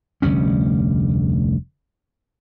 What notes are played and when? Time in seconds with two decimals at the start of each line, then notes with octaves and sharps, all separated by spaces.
0.22 F1 D2 G3 C#4